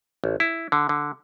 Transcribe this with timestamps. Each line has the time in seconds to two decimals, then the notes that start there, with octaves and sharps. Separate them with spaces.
0.24 A1
0.40 E4
0.72 D3
0.89 D3